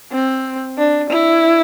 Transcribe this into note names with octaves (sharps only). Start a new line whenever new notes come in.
C4
D4
E4